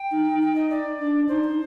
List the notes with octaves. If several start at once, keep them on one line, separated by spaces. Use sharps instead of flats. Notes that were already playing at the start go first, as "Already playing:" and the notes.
Already playing: G5
D#4
D#4
G5
D#5
D5
D4
D#4 C5
D#4